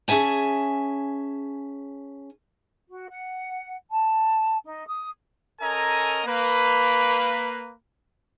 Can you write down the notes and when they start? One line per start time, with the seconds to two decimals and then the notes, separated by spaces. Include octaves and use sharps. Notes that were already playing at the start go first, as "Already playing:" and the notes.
0.08 C#4 G#4 E5 G#5 A5
2.89 F#4
3.09 F#5
3.90 A5
4.65 D#4
4.88 D#6
5.61 C#4 A4 A#4 D#5 G#5 A#5
6.26 A#3 B4